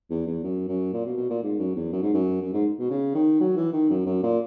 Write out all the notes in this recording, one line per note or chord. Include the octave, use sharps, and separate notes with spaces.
E2
E2
F#2
F#2
A#2
B2
B2
A#2
G#2
F#2
E2
F#2
G#2
F#2
F#2
G#2
B2
C#3
D#3
F#3
E3
D#3
F#2
F#2
A#2